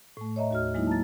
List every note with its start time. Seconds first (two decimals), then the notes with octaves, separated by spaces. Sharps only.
0.17 A2 A3
0.36 C#5 D#5 E5 A#5
0.51 D#2 F#4 F6
0.74 F#3 G#3 A#3 D#4 E4
0.87 A5 A#5 A6